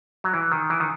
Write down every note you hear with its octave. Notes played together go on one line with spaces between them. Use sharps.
F#3
E3
D#3
E3
D#3